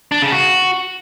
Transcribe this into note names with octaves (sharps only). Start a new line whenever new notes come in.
D4
C#3
F#4